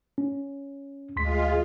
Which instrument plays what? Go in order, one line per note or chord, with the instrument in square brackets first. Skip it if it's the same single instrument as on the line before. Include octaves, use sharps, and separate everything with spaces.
[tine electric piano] C#4
[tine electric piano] D2 C6 B6 [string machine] G#3 F4